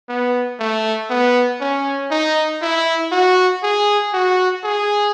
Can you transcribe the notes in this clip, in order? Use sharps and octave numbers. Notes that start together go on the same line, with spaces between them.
B3
A3
B3
C#4
D#4
E4
F#4
G#4
F#4
G#4